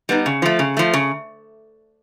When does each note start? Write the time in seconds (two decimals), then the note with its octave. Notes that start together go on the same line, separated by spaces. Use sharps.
0.09 G3 B3 D#4
0.26 C#3
0.42 F3 A3
0.59 C#3
0.77 F3 A3
0.94 C#3